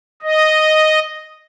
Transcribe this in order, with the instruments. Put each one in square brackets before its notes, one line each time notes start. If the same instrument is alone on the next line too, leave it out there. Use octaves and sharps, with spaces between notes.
[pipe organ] D#5